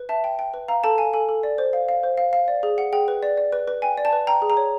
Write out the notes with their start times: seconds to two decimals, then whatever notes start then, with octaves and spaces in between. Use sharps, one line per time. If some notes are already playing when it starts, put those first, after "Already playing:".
Already playing: B4
0.09 E5 A5
0.24 G5
0.39 G5
0.54 B4
0.68 F5 A#5
0.84 A4 A5
0.98 F5 G#5
1.13 A4 G#5
1.29 A4
1.43 D5
1.58 C5
1.73 F5
1.89 F5
2.03 C5
2.18 F5
2.33 F5
2.48 D5
2.63 G#4
2.78 F#5
2.93 G#4 G5
3.08 B4
3.23 D5
3.37 D5
3.52 B4
3.68 B4
3.82 G5 G#5
3.98 D5
4.05 A5
4.13 B4
4.27 G5 A#5
4.42 G#4
4.50 A#5
4.57 C#5